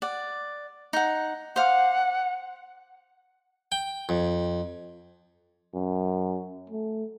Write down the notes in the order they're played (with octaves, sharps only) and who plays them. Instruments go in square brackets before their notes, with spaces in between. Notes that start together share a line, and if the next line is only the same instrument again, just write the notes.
[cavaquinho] D5 F#5
D#4 F#5
[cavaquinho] C5 F5 D6 [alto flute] F#5
[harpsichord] G5
F2
[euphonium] F#2
A3